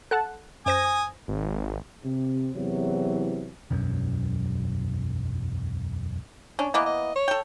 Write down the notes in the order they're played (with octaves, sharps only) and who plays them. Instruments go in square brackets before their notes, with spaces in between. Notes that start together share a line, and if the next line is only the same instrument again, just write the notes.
[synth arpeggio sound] A4 F#5 A5 [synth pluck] F#6
[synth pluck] F#2 C5 A#6 [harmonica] G#5 D#6
[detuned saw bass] G#1
[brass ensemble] C3
E2 C3 E3 F#3
[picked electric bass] E1 B1 F#2
[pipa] C#4 [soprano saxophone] D4
[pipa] E3 A#3 B3 [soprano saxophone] D#5
[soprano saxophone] D#5
C#5
[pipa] A4 G5